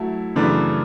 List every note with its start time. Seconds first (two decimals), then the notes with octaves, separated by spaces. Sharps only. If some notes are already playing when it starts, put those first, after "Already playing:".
Already playing: F#3 A3 E4 A4
0.36 F#2 C#3 E3 A3 D4